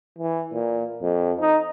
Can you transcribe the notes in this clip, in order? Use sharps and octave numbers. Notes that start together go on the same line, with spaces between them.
E3
A#2
F2
D#4